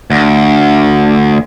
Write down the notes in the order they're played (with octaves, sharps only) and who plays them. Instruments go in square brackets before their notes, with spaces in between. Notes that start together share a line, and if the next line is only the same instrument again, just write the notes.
[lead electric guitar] D2